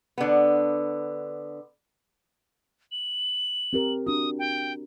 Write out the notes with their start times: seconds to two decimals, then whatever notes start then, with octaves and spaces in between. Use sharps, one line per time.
0.18 D3 B3
2.92 F#7
3.73 C4 G4 A#4
4.07 D4 F#4 D#6
4.39 G5